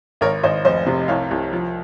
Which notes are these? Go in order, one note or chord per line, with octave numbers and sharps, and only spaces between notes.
G#1 A#4 C#5
G#1 C5 D#5
F1 C5 D#5
C3
C2 C#5 F5
C2
F3